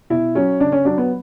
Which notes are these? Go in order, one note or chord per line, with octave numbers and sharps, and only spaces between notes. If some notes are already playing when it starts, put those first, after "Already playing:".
B2 E4
F#3 C#4
C#3 D4
C#4
F#3 D4
B3